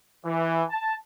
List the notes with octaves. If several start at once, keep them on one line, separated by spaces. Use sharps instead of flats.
E3
A5